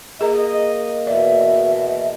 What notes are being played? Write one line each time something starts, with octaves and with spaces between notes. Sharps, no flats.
A#3 G#4 A#4 D#5 A#5
E2 B2 D5 E5